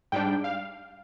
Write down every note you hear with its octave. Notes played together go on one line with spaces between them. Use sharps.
G#2 G3 D4 G5
F5